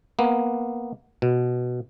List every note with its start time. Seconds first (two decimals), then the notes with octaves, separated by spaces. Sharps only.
0.19 A#3 B3
1.22 B2